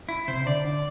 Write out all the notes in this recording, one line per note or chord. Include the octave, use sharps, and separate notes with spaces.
E4
C3 C5
C3
D3 D5
D3